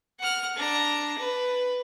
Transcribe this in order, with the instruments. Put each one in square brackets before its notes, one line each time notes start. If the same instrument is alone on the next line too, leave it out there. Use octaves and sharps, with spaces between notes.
[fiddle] F#5 F6
D4 A#5
B4